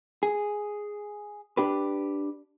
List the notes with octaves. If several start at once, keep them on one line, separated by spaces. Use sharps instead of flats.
G#4
D4 G4 B4